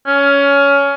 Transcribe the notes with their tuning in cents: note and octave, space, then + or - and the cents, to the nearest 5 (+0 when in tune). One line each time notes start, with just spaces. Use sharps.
C#4 +15